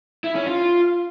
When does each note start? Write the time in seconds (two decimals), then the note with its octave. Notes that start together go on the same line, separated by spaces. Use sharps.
0.24 E4
0.35 C#4
0.47 F4